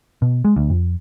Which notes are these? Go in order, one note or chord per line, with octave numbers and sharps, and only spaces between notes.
B2
G#3
D2
F2